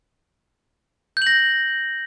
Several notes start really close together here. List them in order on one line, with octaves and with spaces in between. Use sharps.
G6 F#7 A#6